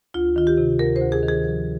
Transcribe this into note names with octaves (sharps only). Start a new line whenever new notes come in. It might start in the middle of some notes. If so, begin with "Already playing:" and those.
D2 F4
D#3 F4
G4
C3
D2 A#4
C5
D2
G#4
D#3
G#4
F3